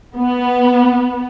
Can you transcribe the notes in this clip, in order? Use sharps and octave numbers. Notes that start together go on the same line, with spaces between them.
B3